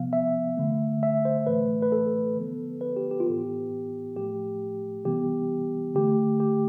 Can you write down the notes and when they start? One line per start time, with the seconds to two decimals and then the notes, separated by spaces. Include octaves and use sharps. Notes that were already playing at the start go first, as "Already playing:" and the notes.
Already playing: C3 F3 B3 F5
0.13 E5
0.57 D3 A3
1.03 E5
1.25 C5
1.47 A2 E3 A3 B4
1.82 B4
1.92 A4
2.37 D3 F3 B3
2.81 B4
2.97 G4
3.11 G4
3.20 F4
3.26 A2 E3 B3 G4
4.16 A2 F3 A3 G4
5.05 C3 E3 G3 B3 G4
5.95 D3 A3 G4
6.40 G4